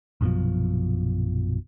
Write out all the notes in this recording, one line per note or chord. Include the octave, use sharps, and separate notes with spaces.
A#1 F#2 B2 F3